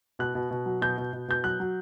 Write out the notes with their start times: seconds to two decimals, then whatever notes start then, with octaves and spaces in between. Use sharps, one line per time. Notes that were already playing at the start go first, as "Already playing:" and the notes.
0.19 B2 F#6
0.35 B2
0.51 B2
0.66 F#3
0.82 B2 G6
0.98 B2
1.13 B2
1.28 B2 G6
1.44 F#3 F#6
1.60 F#3